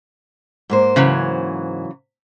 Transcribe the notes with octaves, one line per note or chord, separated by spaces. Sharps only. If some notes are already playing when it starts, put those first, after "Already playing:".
G#2 A#3 C5
C#3 E3 F#3